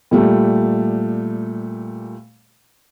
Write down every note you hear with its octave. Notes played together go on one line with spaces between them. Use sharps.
A#2 G3 A3